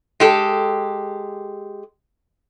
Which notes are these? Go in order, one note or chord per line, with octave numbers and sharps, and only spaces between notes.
G#3 G4 A4